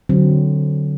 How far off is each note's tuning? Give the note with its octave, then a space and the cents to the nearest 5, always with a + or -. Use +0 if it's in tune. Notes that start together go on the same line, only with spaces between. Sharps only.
D3 +0 F#3 +10 C4 +0